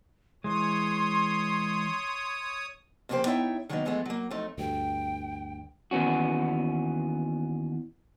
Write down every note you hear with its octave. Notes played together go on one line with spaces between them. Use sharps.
E3 G#3 C#5 C6 D#6
F2 C#3 A#3 C4 G4 C5
B3 D#4 E4 C#5 E5 G5
D#3 F#3 G3 A#3 B3 D#4
E3 F3 G#3 A3 B3
F#3 A#3
F2 F#3 A3 D#4
D2 G2 G5
D#2 E3 B3 C#4 F#4